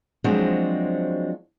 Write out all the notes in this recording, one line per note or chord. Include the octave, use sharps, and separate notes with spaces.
F3 F#3 G#3 C4 D4 F#4